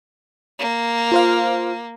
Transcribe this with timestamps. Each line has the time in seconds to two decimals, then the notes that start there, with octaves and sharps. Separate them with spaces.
0.59 A#3
1.12 F4 C5 F5